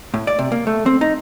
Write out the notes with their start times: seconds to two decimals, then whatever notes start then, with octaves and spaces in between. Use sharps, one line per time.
0.14 A2
0.27 D5
0.39 C3
0.52 A#3
0.67 A3
0.86 C4
1.01 D#4